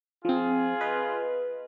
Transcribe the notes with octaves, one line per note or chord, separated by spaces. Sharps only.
F3 C4 F4 G#4
B4 D#5